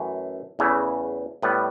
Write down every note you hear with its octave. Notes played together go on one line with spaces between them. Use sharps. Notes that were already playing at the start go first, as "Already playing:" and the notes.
Already playing: F#2 E3 A3
E2 C#3 E3 A3
A2 G3 B3 B4